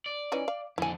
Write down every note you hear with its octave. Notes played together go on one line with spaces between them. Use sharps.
D5
E3 C#4 D#4
F5
F2 D3 E4 G#5